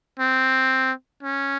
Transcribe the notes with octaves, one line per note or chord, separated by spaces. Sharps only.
C4
C#4